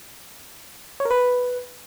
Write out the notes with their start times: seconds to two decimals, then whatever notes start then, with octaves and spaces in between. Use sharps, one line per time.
1.00 C#5
1.05 A#4
1.11 B4